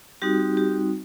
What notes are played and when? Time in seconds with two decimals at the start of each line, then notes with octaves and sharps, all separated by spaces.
0.22 G3 C4 D#4 F#4 G4
0.40 G4
0.57 G4